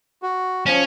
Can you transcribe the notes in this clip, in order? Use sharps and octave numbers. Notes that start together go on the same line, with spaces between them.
F#4
F3 C#4